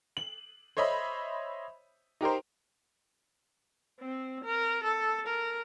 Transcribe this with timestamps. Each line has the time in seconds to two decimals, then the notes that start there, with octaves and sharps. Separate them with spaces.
0.17 F#7
0.77 C5 C#5 D#5 E5 B5
2.21 D#4 G4 A#4 C5
4.00 C4
4.44 A#4
4.83 A4
5.27 A#4